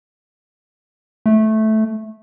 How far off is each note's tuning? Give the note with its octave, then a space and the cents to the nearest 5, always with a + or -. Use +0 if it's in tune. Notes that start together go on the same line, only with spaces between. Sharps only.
A3 -10